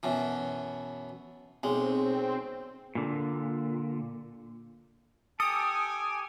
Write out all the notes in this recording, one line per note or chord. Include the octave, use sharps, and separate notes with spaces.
F#2 B2 E3
B1 G#3 C4
A#2 D3
G4 A4 G#5 D#6